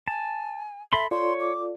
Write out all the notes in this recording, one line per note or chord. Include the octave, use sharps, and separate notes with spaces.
G#5 A5
A4 E5 B5 C6
F4 A4 C#5 D5 C6
D6